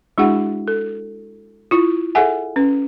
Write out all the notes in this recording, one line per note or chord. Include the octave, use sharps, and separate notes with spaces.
G#3 D4 E4 F#4 G#4 F#5
A4
E4 F4
G#4 A4 E5 F#5 G#5
C#4 B4